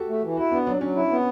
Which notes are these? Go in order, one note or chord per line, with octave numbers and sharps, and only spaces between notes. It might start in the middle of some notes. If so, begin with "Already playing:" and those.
Already playing: F#4 G4 A4
A3
E3
E4 F#4
B3 D4
F#3 D4
F#3 C#4
E4
B3